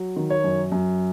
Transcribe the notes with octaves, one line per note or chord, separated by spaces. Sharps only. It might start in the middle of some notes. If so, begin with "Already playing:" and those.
Already playing: F#3
D#3
C#5
F#2
F#2